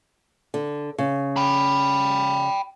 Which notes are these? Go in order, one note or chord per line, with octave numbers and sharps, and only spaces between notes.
D3
C#3
G5 B5